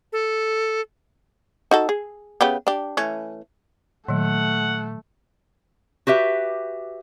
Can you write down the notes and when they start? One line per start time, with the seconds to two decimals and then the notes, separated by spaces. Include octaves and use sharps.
0.13 A4
1.71 D#4 F#4 A4
1.89 G#4
2.41 C#3 B3 G4
2.67 D4 G4
2.97 E3 A3 C#4
4.08 A#2 D#3 F#3 A3 F#5
6.07 F#4 G4 B4 E5